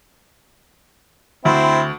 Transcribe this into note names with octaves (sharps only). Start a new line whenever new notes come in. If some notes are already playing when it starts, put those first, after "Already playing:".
D2 C4 E4